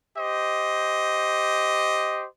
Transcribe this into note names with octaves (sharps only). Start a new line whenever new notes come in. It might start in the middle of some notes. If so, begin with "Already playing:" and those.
G4 C5 D#5